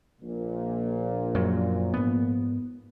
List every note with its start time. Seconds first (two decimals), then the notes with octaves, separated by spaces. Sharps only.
0.21 A#1 A#2
1.35 F#2 F#3
1.94 G#2 B3